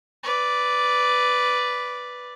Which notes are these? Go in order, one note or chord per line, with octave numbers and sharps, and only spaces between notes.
B4 D5